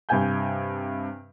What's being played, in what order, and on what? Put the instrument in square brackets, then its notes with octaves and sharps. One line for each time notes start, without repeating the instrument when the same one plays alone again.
[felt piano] G2 C3 G#5 G6